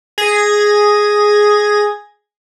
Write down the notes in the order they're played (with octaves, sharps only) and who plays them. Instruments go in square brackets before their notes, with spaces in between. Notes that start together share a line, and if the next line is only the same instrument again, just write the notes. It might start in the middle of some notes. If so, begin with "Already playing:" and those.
[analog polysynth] G#4 G#6 A#6